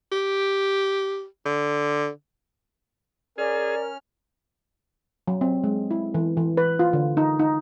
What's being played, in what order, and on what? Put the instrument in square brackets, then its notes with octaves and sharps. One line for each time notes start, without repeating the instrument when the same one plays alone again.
[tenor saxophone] G4
D3
[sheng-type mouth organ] C#4 F6 [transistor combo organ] G#4 [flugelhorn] A#4 [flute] D5
[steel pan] F#3
C4
G#3
E4
E3
E3
B4
F4
D3
D#4
D#4